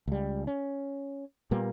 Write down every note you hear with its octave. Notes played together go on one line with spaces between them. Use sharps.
C#2 G3
C#4
A#2 G3 A#3 B3